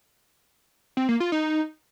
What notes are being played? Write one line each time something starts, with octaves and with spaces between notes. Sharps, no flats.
C4
A#3
F4
D#4